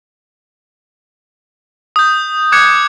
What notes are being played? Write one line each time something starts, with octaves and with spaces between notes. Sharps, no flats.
D#6 G6
D6 F#6 G#6 C#7